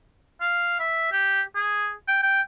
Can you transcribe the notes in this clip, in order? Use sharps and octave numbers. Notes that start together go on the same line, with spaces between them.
F5
E5
G4
G#4
G5
G5